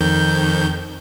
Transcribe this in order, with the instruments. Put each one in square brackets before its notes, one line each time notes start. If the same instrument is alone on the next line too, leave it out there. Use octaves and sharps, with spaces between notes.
[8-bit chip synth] F2 D#3 G6